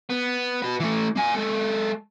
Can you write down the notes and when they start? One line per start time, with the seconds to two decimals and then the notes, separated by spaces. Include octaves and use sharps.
0.10 B3
0.62 F#4 B4
0.80 E3 A3
1.16 A#3 G#5
1.35 G#3 A4